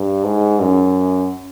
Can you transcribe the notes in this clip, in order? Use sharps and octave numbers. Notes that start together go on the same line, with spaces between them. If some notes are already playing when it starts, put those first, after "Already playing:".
Already playing: G2
G#2
F#2